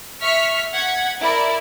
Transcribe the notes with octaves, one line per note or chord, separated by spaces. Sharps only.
E5 C#6 F6 B6
F#5 G#6 B6
E4 A#4 D5